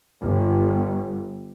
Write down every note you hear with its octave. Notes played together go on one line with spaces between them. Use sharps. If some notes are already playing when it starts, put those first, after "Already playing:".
G1